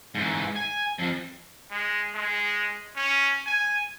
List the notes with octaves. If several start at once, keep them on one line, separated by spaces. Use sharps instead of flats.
G#2 E3
G#5
F2 F3
G#3
G#3
C#4
G#5